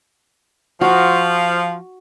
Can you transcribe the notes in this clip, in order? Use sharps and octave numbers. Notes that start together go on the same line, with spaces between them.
F3 F#4